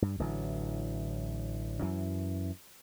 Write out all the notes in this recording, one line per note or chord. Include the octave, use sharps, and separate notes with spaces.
G2
A1 D3 E3 F#3
F#2 E3